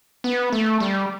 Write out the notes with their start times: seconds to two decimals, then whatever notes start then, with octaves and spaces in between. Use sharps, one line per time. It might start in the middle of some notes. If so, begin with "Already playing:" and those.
0.24 B3
0.52 A3
0.80 G3